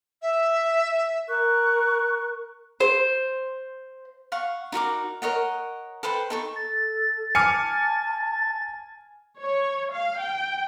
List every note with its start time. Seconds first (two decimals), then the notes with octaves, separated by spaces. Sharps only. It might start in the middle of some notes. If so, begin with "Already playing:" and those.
0.22 E5
1.28 A#4 C#6 F#6
2.80 C5
4.32 F5 F#5 C#6
4.72 D#4 F#4 A#4 D6
5.22 A#4 C#5 D#5 F#5
6.03 A4 B4 C5 G5
6.30 D#4 A4 C#6
6.56 A4 A6
7.35 G#5 A5 D6 F6 C#7
9.38 C#5
9.91 F5
10.20 G5